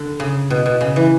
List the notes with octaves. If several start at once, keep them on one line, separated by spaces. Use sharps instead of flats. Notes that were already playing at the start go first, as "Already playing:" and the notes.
Already playing: D3
C#3
B2
B2
C#3
E3